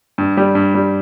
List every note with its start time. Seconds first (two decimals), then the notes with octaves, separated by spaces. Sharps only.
0.18 G2
0.37 G3
0.55 G2
0.75 G3